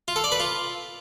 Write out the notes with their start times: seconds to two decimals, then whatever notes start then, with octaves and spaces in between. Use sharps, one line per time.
0.08 F4
0.16 A4
0.24 D5
0.32 B4
0.40 F4